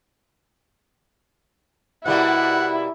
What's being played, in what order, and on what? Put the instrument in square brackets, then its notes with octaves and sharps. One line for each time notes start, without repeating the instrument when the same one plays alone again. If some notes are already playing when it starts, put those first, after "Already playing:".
[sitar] B2 G3 A#3 [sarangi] E4 [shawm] F#5